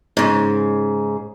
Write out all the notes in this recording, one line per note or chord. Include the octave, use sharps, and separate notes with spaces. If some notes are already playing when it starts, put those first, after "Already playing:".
G#2 C#3